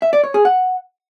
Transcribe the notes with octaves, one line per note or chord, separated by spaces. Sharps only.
E5
D5
C#5
G#4
F#5